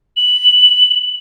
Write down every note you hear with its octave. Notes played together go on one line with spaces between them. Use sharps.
F#7